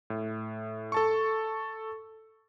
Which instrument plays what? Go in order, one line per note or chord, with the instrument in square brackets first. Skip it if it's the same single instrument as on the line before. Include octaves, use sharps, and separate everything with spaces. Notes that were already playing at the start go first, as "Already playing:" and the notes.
[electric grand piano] A2
A4 A5 C#6